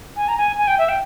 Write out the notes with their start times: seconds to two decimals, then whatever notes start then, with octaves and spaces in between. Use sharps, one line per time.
0.16 G#5
0.28 A#5
0.38 G#5
0.58 G#5
0.68 G5
0.78 E5
0.89 G5